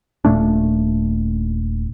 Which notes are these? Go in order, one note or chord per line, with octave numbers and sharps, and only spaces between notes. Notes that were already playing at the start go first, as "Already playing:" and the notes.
D#1 A#2 A3 D4